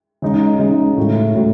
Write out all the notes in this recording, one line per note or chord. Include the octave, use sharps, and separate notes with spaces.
C#3 G#3 D#4
C#3 G#3 D#4
A2 F#3 A3 E4
A2 F#3 A3 E4